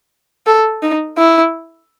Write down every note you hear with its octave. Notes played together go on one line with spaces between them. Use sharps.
A4
D#4
E4